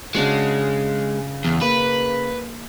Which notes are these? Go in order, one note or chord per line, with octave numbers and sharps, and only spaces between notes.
C#3 G#3 D4 F#4
E2
A#3 B4